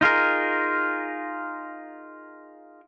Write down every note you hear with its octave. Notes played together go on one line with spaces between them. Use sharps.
D#4 F4 G#4 A#4